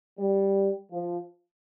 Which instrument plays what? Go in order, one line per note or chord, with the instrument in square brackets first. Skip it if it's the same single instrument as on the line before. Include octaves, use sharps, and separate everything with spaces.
[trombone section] G3
F3